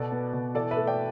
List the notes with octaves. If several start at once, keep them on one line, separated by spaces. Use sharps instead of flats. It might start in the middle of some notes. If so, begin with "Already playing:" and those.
Already playing: B2 A4 D5
B3
B2
E3 A4 D5
B4 E5
A3
D5 G5